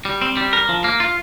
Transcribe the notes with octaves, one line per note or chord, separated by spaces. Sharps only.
G3
C4
G3
A#4
F3
A#3
F4